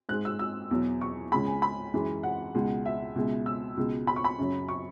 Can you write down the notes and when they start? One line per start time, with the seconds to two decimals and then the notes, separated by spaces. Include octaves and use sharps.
0.09 G#2 G#3 F#6
0.25 E6
0.39 E6
0.71 E2 B2 F#3
1.01 C#6
1.32 C#2 C#3 G#3 B5
1.47 G#5
1.62 B5
1.94 F#2 E3 G#3
2.23 F#5
2.55 C#2 B2 G#3
2.86 E5
3.15 C#2 B2 G#3
3.46 E6
3.77 C#2 B2 G#3
4.07 B5
4.16 C#6
4.24 B5
4.39 F#2 C#3 F#3
4.69 C#6